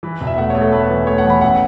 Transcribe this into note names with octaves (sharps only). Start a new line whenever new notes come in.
E3 B4
E1
E5
A3 F#5
A3 C#5
A4
A3 B4
E3
A3 C#5
F#5
E3
B5
A1 F#5